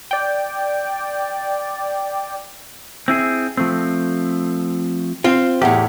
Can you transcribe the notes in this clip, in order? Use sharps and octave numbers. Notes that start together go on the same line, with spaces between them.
D5 G5
C4 E4 G#4
F3 A3 C4
C4 F4
E2 A2 G4